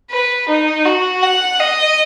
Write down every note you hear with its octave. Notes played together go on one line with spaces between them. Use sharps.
B4
D#4
F#4
F#5
D#5